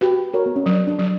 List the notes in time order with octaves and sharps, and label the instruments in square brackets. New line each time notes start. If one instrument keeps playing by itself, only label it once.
[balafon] F#4 [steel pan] G4 B4
[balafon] F#4 [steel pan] A#4 C#5
[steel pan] B3
C#4
[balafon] F#3 [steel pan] D4
[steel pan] D4
[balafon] F#3